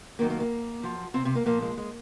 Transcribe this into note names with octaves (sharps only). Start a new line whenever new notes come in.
D#2 D#3 F#3 A#3
A#3
A#3
F#2 F3
C3 C4
C3 C4
A#3
A#2 F3 A#3
G#3
G#3